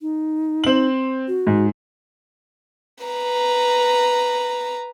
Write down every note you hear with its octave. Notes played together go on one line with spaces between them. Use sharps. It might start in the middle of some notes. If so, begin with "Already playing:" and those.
D#4
C4 F#7
F#4
G#2
B4 A#5